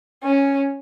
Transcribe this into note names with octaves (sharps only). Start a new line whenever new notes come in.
C#4